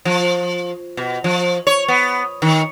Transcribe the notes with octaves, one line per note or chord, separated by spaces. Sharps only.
F3
B2
F3
C#5
B3
D#3